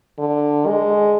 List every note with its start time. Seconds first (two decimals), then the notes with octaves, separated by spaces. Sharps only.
0.19 D3
0.67 G#3